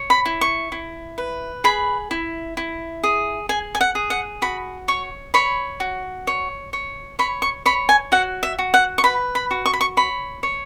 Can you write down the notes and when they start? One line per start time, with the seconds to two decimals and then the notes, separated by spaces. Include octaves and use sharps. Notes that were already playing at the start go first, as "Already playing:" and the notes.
Already playing: C#5
0.10 B5
0.26 E4
0.41 C#6
0.72 E4
1.18 B4
1.64 G#4 B5
2.11 E4
2.57 E4
3.04 G#4
3.49 G#4 G#5
3.75 G#5
3.81 F#5
3.95 G#4
4.10 F#5
4.42 F#4 B5
4.88 C#5 C#6
5.34 C#5 B5
5.80 F#4
6.27 C#5
6.73 C#5
7.19 C#5 B5
7.42 C#6
7.66 C#5 B5
7.89 G#5
8.12 F#4 F#5
8.43 E5
8.59 F#4
8.74 F#5
8.98 C#6
9.04 B4 B5
9.35 B5
9.51 F#4
9.66 C#6
9.73 B5
9.81 C#6
9.97 C#5 B5
10.43 C#5